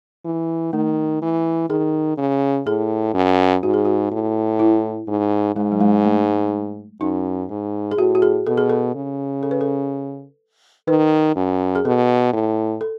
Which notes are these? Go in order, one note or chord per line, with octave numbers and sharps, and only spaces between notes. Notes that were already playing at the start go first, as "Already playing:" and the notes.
E3
D#3 A3
E3
D#3 G#4
C#3
A2 G#4
F#2
G#2 F#4
G#4
F#4
A2
E4
G#2
G#2 G#3
F#3
G#3
A3
F#2 D#4
G#2
G#4
A2 F#4
F#4
G#4
B2 A4
G#4
A4
C#3
A4
B4
A4
D#3 B4
F#2
G#4
B2 A4
A2
A4